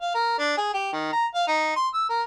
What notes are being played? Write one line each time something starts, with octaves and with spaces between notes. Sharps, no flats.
F5
A#4
D4
G#4
G4
D#3
A#5
F5
D#4
C6
E6
A#4